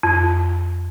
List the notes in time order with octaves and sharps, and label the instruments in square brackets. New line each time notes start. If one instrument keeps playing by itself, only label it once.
[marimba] F2